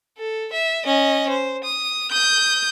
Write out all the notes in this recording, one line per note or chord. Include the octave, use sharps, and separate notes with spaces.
A4
E5
C#4 D#5
C5
D#6
D#6 G6